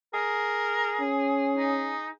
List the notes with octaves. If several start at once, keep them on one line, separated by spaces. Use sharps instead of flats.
G#4 A#4
C#4
D#4